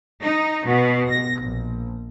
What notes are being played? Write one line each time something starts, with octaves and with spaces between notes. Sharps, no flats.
D#4
B2
A#6
A#1